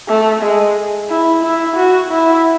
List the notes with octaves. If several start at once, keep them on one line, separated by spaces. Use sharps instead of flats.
A3
G#3
E4
E4
F#4
E4